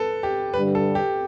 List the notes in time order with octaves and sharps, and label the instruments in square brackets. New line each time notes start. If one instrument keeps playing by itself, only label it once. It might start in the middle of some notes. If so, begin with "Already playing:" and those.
Already playing: [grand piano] A4 B4
G4
[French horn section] G2 D3 G3 [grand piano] B4
[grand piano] A4
G4